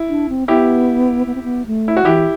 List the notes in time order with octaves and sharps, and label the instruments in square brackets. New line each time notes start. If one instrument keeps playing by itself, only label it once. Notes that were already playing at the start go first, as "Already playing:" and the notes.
Already playing: [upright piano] E4
[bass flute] D4
C4
[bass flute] B3 [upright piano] E4 G4
[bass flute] B3
C4
B3
A3
[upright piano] E4
F#4
[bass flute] E3 [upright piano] E4 G4